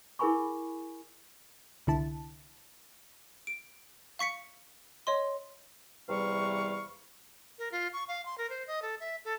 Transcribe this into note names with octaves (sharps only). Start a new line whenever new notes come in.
E4 G#4 A#4 G#5 B5 C#6
C2 D3 E4 A5
D7
F5 C#6 B6 C#7
C#5 D#5 C6
E2 C3 E3 G3 F5 C#6
A#4
F4
C#6
F5
C6
A#4
C5
D#5
A4
E5
A4